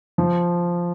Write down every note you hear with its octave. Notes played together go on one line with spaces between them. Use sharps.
F3